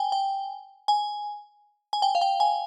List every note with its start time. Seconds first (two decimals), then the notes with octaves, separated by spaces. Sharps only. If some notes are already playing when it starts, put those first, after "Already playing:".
Already playing: G5 G#5
0.12 G5
0.88 G#5
1.93 G#5
2.02 G5
2.15 F5
2.21 G5
2.40 G#5